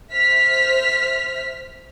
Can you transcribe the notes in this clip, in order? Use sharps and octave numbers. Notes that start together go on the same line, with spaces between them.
C5 E5 F6 B6